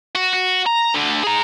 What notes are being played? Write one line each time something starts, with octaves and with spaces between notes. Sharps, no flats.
F#4
F#4
A#5
D2 D3
G#4 A#5